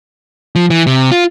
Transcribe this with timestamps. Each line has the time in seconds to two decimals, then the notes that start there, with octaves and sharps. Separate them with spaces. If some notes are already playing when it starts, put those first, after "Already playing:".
0.56 F3
0.70 E3
0.87 C3
1.11 F4